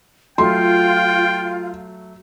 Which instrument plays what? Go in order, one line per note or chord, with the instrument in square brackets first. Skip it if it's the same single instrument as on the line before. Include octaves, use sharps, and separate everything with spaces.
[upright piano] F#3 A3 [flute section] F4 [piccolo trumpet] G5 [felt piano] C6